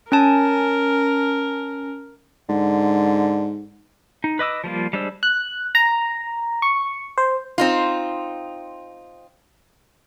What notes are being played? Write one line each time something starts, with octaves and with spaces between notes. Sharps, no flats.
C#4 A#4 G#5 A5
G#2 D3
D#4
B4 D#5 D6 E6
F3 G3 A#3 F4
G3 G#3 D4 C5 E6
F#6
A#5
C#6
C5
C4 D#4 F4